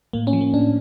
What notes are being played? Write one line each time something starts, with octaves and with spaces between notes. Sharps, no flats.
A2 A#3
C#4
F3
A#3
A2 D4